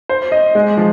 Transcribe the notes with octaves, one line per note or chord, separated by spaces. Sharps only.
C5
D#5
G#3
F3